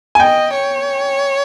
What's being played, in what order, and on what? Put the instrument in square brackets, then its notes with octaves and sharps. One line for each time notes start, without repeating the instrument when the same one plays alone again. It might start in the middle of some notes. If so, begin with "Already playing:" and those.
[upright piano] G#5
[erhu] D#5 [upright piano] G5
[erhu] C#5